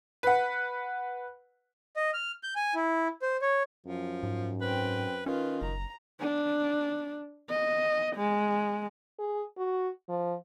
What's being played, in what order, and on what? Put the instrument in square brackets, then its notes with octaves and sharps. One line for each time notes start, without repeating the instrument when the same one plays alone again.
[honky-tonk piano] B4 F#5
[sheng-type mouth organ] D#5
F6
G6
G#5
E4
C5
C#5
[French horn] F#2 [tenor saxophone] F3
[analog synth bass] G#2
[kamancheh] C4 G5 [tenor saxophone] B4
[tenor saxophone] D#3 [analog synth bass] C#4 [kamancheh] F4 B4
[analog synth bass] F#1 [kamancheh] A#5
[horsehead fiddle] D4
D#5
G#3
[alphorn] G#4
F#4
F3